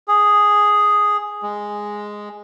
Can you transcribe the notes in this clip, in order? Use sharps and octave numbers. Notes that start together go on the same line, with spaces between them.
G#4
G#3